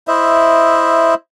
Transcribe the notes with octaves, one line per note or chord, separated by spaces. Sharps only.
E4 C5 D#5 E5